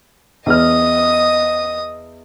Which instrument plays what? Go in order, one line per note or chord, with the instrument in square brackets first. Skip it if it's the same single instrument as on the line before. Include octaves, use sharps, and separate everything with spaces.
[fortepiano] E2 F6 [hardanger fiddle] D#5 D#6